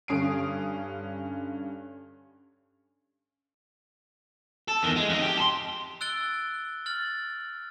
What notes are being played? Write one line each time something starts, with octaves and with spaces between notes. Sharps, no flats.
G2 D3 C#4 D#6 C7 D7
A4
E2 D#3
G#3
F2 D#4
G4
A5 C6
E6 F#6 A6 D7 G7
F6 A6 F#7